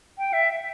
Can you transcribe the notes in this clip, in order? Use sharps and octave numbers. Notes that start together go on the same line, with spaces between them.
G5
E5